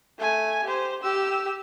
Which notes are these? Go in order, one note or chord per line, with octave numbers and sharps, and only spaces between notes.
A3 G#5
G4 C5
G4 E6